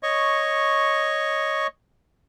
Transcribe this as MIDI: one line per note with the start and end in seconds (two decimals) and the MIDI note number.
0.03 1.67 73
0.03 1.67 75
0.03 1.67 85